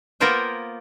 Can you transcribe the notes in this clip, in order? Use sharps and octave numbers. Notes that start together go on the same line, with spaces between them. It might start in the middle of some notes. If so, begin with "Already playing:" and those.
A#3 B3 F4 A#4 C5 G5